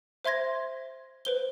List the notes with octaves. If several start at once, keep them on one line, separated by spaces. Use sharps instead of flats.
C5 E5 C6 G#6 A#6
B4 C5 G7